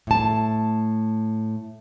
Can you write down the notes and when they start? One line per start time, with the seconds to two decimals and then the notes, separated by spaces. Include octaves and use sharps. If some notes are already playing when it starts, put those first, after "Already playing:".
0.07 A2 A5